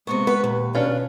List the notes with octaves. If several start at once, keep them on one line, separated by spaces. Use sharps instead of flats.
C3 G#3 A#3 B3 C#6
B3 B4
D#2 A#2
B2 C#4 D4 F4 B4